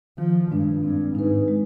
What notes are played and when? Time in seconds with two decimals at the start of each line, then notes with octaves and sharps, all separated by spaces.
0.18 D#3 F3
0.51 G2 G#3 D4
0.83 G2 C4
1.15 G#2 D#4 B4
1.48 G#3